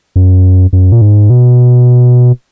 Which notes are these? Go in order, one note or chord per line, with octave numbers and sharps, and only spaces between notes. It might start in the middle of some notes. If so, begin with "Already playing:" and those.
F#2
F#2
A#2
G#2
B2